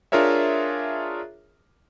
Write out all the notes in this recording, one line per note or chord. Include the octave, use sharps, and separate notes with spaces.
D4 F4 G#4 A#4 C#5 E5